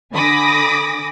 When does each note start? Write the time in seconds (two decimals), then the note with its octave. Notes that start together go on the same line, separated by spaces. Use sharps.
0.13 D3 G#5 B5 D6 D#6 A#6